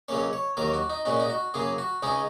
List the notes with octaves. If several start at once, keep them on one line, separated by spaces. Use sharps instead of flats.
C#2 C#3 F#3 A#3 C#4 C#5
C#5
D#2 D#3 F#3 A#3 A#4
F#4
D#4
A#2 G#3 C#4 F#4
D#4
F#4
F#2 C#3 A#3 G#4
F#4
C#2 C#3 G#3 C#4 D#4